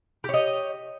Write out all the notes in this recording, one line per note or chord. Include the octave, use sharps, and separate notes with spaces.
G4 C#5 D#5